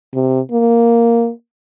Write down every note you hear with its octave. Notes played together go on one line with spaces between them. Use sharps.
C3
A#3